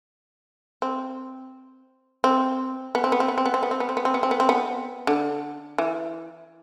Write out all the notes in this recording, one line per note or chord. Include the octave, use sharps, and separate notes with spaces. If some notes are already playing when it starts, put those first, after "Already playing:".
C4
C4
B3
C4
B3
C4
B3
C4
B3
C4
B3
C4
B3
C4
B3
C4
B3
C4
B3
C4
B3
D3
E3